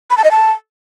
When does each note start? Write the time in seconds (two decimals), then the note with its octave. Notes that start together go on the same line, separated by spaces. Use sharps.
0.10 B5
0.17 A5
0.24 D#5
0.31 A5